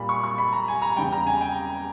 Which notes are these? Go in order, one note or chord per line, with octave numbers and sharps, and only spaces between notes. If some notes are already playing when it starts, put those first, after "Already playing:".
Already playing: A#2 G3 B5
C#6
C#6
B5
A#5
G#5
A#5
E2 C#3 G3 G5
A#5
G#5
G5